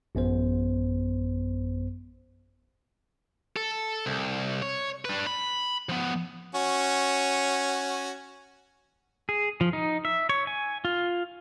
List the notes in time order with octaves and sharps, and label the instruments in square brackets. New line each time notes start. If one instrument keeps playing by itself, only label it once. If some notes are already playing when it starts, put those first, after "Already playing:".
[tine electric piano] A1 F#2 B3 C5
[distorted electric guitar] A4
C2
C#5
D4 B4
B5
F3 B3
[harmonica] C#4 F#4
[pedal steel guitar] G#4
F3
D#4
E5
C#5
G#5
F4